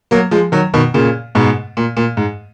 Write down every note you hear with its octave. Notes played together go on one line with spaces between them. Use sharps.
F#3 A#3
F3 G#3
D#3 F#3
B2 D#3
A#2 C#3
G#2 B2
A#2
A#2
G#2